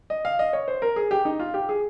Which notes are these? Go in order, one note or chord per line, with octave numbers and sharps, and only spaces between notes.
D#5
F5
D#5
C#5
C5
A#4
G#4
G4
D#4
F4
G4
G#4